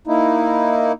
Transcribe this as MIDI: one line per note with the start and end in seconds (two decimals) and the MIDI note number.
0.07 0.92 58
0.07 0.92 63
0.07 0.92 64